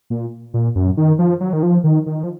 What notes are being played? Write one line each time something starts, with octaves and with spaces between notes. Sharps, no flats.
A#2
A#2
F#2
D#3
F3
F#3
D#3
F3
D#3
D#3
F3